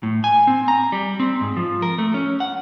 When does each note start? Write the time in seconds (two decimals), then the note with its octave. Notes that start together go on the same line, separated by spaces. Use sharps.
0.03 A2
0.24 G#5
0.47 C4
0.68 A#5
0.92 G3
1.20 C4
1.41 G#2
1.57 F3
1.82 A#4
1.98 A3
2.14 C#4
2.40 F#5